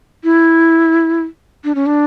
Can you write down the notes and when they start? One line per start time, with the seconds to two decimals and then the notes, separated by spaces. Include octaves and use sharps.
0.24 E4
1.64 D4
1.75 C#4
1.86 D4